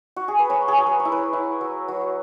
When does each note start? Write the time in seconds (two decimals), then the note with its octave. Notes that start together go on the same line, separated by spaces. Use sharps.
0.16 F#4
0.28 G#4
0.39 B4
0.50 F#3 C#5
0.68 G#4
0.78 F#3
0.87 B4
1.00 C#5
1.05 E4
1.12 B4
1.33 E4
1.61 F#3
1.88 F#3